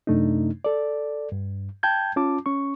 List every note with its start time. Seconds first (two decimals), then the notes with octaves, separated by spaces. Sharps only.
0.07 F#2 C3 A3 D4 D#4
0.65 A4 D5
1.32 G2
1.83 G5 A5 G6 G#6
2.16 C#4 F4 A5 D6
2.46 C#4 C#6